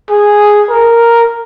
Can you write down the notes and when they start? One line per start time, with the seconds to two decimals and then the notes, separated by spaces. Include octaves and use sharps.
0.10 G#4
0.69 A#4